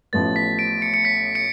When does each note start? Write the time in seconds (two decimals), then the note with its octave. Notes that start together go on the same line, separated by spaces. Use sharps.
0.13 A1 A2 F3 B3 A6
0.36 B6
0.59 D7
0.82 C#7
0.94 C#7
1.05 B6
1.35 C#7